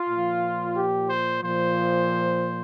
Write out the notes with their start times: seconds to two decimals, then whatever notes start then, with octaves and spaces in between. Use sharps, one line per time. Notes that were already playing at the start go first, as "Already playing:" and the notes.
Already playing: F4
0.09 A#2 F3
0.75 G4
1.08 C5
1.41 A#2 F3 C5